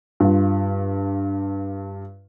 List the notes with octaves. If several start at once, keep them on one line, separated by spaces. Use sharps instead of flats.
G2 F4